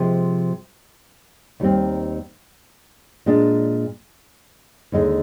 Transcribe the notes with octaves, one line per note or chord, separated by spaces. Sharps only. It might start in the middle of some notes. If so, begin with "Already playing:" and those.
Already playing: C3 F3 G#3
D#2 D#3 G3 C4
A#2 G#3 D4
D#2 D3 G#3 D#4